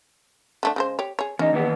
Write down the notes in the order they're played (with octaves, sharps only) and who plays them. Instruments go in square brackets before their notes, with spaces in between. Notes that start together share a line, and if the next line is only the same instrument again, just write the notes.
[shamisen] D3 A3 D4
C#3 G#3 C5
G4 C#5
G#4 C#5
[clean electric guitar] E2 D#4 [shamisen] C#4
[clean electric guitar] D#2 E3 B3